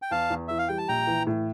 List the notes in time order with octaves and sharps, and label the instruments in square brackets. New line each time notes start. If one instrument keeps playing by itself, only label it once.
[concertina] G5
[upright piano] E2 [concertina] F5 A5
[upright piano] E2
[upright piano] E3 [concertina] E5
[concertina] F5
[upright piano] G3 [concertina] G5
[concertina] A5
[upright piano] A#1 [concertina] G5 A#5
[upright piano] E3
A2